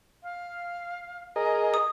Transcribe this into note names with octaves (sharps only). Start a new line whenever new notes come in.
F5
G#4 A#4 D#5 A#5
D#6